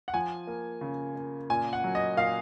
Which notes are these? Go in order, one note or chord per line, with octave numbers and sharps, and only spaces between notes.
F#5
F3 G#5
A#3
C#3
A#3
A#2 G#5
F#5
F#3
D#5
A#2 F5